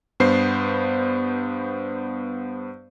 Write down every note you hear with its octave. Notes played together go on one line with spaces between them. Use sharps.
G2 B3 C5 C7